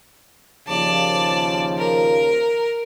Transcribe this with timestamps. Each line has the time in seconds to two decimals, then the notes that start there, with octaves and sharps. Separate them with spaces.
0.68 D#2 C#3 F3 D5 A5
1.78 A#4